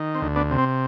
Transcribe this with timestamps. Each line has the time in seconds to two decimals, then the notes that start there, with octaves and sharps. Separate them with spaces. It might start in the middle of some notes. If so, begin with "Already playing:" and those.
Already playing: D#3
0.15 C4
0.22 D2
0.36 B3 D4
0.51 C3
0.58 C4